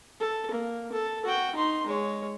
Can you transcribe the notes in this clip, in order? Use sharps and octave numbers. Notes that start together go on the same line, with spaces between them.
A4
A#3
A4
F#4 G5
D#4 C6
G#3 C#5